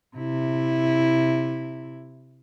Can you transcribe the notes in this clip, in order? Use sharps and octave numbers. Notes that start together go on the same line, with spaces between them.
C3 E4